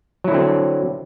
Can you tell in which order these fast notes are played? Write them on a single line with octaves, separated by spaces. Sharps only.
F#3 E4 D3 C4